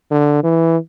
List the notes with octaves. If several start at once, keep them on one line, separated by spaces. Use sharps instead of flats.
D3
E3